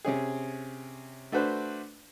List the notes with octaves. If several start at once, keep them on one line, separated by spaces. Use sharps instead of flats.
C3 C#4 G#4
A3 D4 F#4 B4 C5